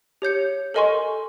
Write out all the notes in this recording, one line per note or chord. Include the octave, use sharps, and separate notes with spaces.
G4 C#5 G6 C#7
A4 A#4 D#5 G#5 C6 C#6